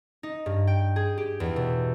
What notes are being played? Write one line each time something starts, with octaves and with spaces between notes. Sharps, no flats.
D#4
G2
G5
G#4
G4
E2
B2